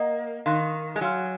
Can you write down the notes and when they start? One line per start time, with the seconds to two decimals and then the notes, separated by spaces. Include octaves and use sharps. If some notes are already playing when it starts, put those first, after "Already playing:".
Already playing: A#3 D#5 F#5 A#5 D#6
0.46 D#3 F5 C6 F#6
0.96 G#3
1.01 F#3 F5 G#5 C6 F6